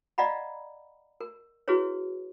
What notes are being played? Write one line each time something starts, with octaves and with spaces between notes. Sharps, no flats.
D5 D#5 F5 F#5 A#5 B5
A#4
E4 F#4 G#4 B4 C#5